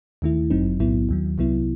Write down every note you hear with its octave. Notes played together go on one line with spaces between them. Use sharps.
D#2 D#3 A3 E4
G1 F#2 F#3 C4 D#4
B1 A2 F#3 B3 E4
D#2 D#3 F#3
C2 C3 F#3 B3 E4